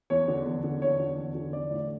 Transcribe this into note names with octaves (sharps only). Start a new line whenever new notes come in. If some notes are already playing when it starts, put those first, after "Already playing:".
E2 C#5
D3
E2
D3
E2 C#5
D3
E2
D3
E3 D5
A2